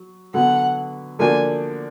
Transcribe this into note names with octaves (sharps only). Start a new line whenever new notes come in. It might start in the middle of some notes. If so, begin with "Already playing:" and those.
Already playing: F#3
D3 F#3 B3 F#5
D3 F3 A#3 D4 F#4 G#5